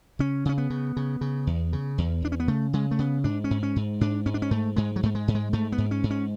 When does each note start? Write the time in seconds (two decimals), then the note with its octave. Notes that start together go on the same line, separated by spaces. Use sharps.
0.19 C#3 C#4
0.45 C#3 C#4
0.58 B3
0.70 C#3
0.97 C#3
1.21 C#3
1.47 E2
1.73 C#3
1.98 E2
2.22 E2 D4
2.32 C#4
2.40 B3
2.48 C#3 A3
2.73 C#3 G#3
2.91 A3
2.99 C#3 B3
3.24 G#2 D4
3.44 C#4
3.51 G#2
3.63 C#4
3.76 G#2
4.01 G#2 D4
4.26 G#2 C#4
4.34 D4
4.42 C#4
4.51 G#2 A3
4.76 G#2 G#3
4.96 F#3
5.03 G#2 A3
5.15 G#3
5.28 G#2
5.35 G#3
5.53 G#2 A3
5.72 B3
5.78 G#2
5.91 C#4
6.03 G#2
6.10 C#4